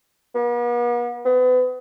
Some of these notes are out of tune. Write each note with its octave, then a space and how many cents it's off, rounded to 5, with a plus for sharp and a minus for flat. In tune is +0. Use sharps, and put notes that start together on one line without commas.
B3 -45
B3 +35